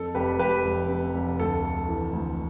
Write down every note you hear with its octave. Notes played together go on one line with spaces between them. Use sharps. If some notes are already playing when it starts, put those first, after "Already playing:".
Already playing: F2 A4
F1 G4 B4
F1 G4 B4
F1
C3
F1
D2 A4
A3
E3
D2